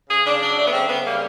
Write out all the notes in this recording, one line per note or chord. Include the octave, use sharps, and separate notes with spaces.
C#3 G#4
C#3 D4
F#3 D4
A3 D4
B3
C#3 C4
C#3 B3
G3 A#3